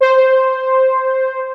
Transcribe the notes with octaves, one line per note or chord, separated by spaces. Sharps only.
C5